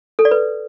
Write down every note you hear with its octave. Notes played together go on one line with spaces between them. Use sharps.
A4
D5
B4